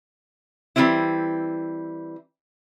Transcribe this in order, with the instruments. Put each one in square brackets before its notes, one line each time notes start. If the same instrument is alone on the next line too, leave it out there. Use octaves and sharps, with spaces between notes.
[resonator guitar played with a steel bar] E3 G3 G#3 C4 E4